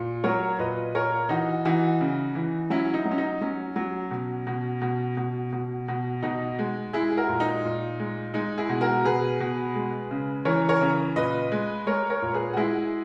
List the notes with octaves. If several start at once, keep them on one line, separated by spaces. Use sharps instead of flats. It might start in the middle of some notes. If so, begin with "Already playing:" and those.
Already playing: A#2
F#3 A#4 C#5
A#2 B4 D#5
A#2 A#4 C#5
E3 D#4 F#4
E3 D#4 F#4
C#3
E3
F#3 C#4 E4
D#4
F#3
C#4
D#4
F#3 C#4
F#3
B2
B2
B2
B2
B2
B2
B2 D#4
G#3
G#3 E4 G#4
G#4
F#4 A#4
A#2
D#4
A#2
G#3
G#3 D#4
E4 G#4
B2
F#4 A#4
B2 G#4 B4
B2
G#3
C#3
E3 A#4 C#5
A#4 C#5
C#3
A#2 B4 D#5
G#3
G#3 A#4 C#5
A#4 C#5
A#2
G#4 B4
F#4
G#3 E4 G#4